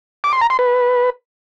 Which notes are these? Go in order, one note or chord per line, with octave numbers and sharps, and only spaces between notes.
D6
C6
A#5
C6
B4